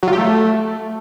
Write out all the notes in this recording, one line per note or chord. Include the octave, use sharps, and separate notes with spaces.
F#3
F4
G4
A3